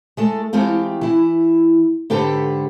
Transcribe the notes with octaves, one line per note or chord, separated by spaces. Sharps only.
G#3 A3 A4
E3 G#3 A3 C4 F4 G4
E3 E4
G#2 D3 G4 A4 B4 C5